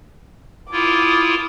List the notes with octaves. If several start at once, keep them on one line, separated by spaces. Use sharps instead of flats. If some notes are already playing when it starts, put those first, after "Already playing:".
E4 F4 D6 D#6